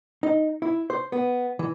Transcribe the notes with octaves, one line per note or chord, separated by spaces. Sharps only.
D#4
E4
C5
B3
E3